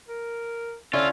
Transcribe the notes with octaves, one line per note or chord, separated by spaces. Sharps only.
A#4
D3 C#4 E4 F4